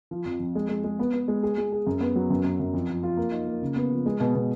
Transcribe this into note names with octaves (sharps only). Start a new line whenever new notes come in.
F3
F2
F2
G#3
G#3
G#3
B3
B3
G#3
G#4
G#3
G#4
F#2
B3
F#3
F#2
F#2
F#2
F2
F3
F4
A#3
D#4
A#3
C#3
B3
F3
G#3
B2
B2